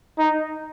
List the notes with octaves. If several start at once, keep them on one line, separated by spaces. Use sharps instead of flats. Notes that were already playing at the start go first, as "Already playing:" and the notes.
D#4